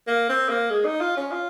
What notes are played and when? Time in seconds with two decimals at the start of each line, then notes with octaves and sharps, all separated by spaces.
0.08 A#3
0.29 C4
0.49 A#3
0.70 G#3
0.85 D#4
1.00 F4
1.17 C#4
1.32 F4